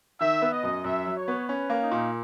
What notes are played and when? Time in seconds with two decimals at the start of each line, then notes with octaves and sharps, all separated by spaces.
0.20 D#3 E5
0.42 B3
0.52 D#5
0.63 F#2
0.84 F#2 E5
1.06 F#3
1.16 C#5
1.28 B3
1.48 C#4 B4
1.70 A#3
1.81 D#4
1.91 A#2